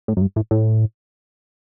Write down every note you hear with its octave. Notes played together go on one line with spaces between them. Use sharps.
A2
F#2
G2
A2
A2